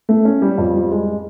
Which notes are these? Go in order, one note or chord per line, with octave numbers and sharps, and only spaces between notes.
A3
C#4
G3
F2
G3
G#3